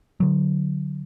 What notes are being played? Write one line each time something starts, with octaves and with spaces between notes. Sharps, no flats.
D3 F#3